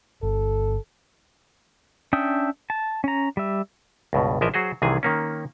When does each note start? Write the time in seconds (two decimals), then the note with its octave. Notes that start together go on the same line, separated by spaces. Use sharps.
0.23 G1 A4
2.13 C#4 D4 E5 G5 D#6
2.70 A5
3.04 C#4 A#5
3.37 G3 E5
4.13 C#2 G2 B2
4.41 A#1 E3 F3 A#4 D#5 E5
4.54 F#3 F#4 G#4 C5
4.82 C2 C3 D#3 E3 G#4 G#5
5.03 D#3 A#3 C#4